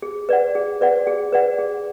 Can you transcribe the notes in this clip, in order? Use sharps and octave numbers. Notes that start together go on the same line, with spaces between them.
G#4
B4 D5 F#5
G#4
B4 D5 F#5
G#4
B4 D5 F#5
G#4